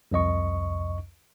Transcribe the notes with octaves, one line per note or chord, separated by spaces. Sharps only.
C2 F2 D#5 C#6